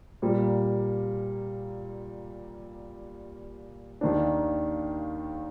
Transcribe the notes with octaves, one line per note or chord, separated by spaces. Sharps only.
A#2 G3 A#3
D#2 D#3 A#3 D4